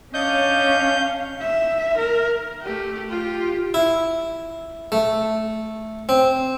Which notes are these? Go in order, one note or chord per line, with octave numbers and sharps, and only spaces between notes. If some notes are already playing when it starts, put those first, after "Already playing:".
C#4 D4 C#5 D#5 F5 G6
E5
A#4
A3 G4
F4 G4
E4
A3
C4